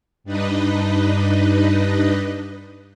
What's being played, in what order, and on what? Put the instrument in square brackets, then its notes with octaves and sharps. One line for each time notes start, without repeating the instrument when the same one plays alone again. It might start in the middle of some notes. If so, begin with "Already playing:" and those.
[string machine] G2 D4 D#4 B4 D#5